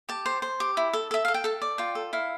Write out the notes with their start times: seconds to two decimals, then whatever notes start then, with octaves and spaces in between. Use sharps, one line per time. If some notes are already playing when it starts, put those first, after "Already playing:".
0.09 G4 A5
0.26 C5
0.42 C5
0.60 G4
0.77 E4
0.93 A4
1.11 A4 E5
1.25 A4 F5
1.34 G5
1.44 A4 A5
1.62 D5
1.78 F4 G5
1.95 A4
2.13 E4 F5